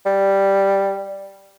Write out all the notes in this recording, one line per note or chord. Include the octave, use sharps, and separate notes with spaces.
G3